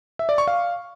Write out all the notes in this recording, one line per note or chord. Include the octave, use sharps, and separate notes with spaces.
E5
D5
C#6
F5